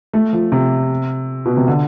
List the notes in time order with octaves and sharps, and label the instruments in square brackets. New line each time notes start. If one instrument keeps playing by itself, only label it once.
[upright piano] A3
F3
C3
B2
C3
D3